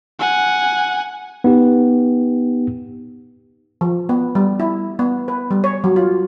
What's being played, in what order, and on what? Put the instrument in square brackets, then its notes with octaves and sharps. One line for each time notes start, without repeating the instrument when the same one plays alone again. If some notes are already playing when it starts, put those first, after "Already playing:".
[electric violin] F#5 G#5
[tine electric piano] B3 D#4 G4
[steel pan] F3
B3
G3
E4
B3
B4
G3
C#5
F#3
F4